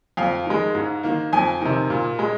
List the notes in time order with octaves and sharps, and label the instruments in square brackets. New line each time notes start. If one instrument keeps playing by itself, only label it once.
[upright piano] F2 F5
D#3 G#3
G#2
D#3 A#3
F2 G#5
C3 D#3
A#2
G#3